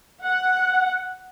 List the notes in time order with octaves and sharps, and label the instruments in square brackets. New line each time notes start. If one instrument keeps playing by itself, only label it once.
[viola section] F#5